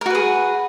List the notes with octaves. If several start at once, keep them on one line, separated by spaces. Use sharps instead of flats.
F#4 G#4 A#4 B4